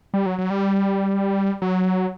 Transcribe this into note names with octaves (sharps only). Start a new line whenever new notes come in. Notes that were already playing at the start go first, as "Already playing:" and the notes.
G3
F#3
F#3
G3
F#3